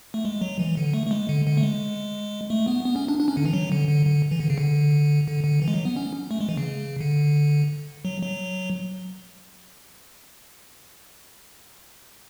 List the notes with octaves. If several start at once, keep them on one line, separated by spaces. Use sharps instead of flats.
A3
G#3
F#3
E3
D3
A3
A3
G#3
D3
D3
A3
G#3
A3
B3
B3
C#4
D4
D4
C#4
D3
E3
F#3
D3
D3
D3
E3
D3
C#3
D3
D3
D3
E3
G#3
F#3
B3
C#4
A3
G#3
E3
C#3
D3
F#3
F#3